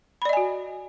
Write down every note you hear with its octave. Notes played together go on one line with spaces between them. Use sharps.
F#4 D5 D#5 G#5 B5